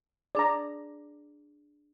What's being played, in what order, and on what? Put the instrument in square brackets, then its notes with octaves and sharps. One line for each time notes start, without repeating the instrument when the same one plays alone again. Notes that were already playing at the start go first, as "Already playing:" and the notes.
[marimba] D4 G#4 [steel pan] D5 A#5